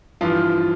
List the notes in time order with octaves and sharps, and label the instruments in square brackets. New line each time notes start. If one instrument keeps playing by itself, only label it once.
[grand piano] G2 E3 F3 F4